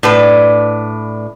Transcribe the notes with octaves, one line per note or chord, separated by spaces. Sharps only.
A2 D4 B4